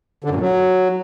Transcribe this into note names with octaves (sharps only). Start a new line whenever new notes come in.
D3
F#2
A#2
F#3